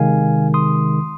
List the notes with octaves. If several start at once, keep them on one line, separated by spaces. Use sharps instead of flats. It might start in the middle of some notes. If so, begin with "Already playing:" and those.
Already playing: C3 D#3 G#3 F5 G#5
C6 D#6